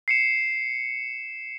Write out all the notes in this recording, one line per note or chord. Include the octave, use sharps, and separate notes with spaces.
C7 C#7 E7